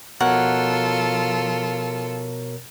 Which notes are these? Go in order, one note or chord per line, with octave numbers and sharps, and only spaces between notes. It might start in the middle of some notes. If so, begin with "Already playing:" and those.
B2 F3 F4 A4 A#4 C#5 F#5